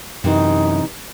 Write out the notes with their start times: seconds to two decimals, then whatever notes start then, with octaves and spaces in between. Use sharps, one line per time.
0.24 F#2 C3 E3 D#4